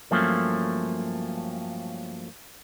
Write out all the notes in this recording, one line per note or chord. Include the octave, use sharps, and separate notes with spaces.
G2 F3 F#3 A3 A#3 C#4